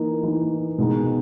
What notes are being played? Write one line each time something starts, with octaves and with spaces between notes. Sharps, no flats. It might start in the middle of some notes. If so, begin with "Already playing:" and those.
Already playing: E3 A#3 D#4
E3 A#3 D#4
B2 G#3 B3 D#4